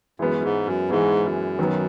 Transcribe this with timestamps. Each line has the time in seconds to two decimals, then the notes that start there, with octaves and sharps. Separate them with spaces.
0.19 F#2 E3 G#3 B3
0.38 F#2
0.44 G#2
0.66 F#2
0.89 G#2 E3 G#3 B3
1.24 F#2
1.59 D#3 F#3 B3